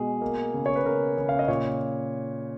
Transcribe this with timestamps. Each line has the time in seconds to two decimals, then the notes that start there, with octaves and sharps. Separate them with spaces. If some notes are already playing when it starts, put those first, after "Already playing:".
Already playing: B2 G#3 G#4
0.22 A#3
0.54 C#3
0.66 C#5
0.75 B4
0.85 C#3 A#4
1.17 C#3
1.29 F5
1.39 D#5
1.48 A#2 C#5